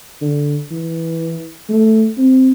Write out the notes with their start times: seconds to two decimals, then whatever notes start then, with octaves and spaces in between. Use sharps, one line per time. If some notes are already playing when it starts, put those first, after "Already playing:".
0.22 D3
0.71 E3
1.69 A3
2.18 C4